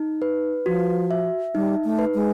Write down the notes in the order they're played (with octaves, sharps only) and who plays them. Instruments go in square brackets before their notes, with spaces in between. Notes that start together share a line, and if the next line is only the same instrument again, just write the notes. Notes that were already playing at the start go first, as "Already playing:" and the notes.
Already playing: [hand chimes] D#4
B4
[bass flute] F3 [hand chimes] F#4
[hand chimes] E5
[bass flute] G3 [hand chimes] D#4
[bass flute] A3
[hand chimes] B4
[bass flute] G#3